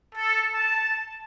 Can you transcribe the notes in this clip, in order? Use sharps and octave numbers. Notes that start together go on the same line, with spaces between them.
A4
A5